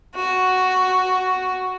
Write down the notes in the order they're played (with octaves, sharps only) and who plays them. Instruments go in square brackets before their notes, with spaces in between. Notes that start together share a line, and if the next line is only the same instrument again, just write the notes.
[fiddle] F#4